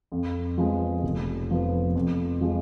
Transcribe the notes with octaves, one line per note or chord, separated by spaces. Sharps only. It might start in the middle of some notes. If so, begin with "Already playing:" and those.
F2
F3 G#3 B3
F1
F2 F3 B3
F2
F3 G#3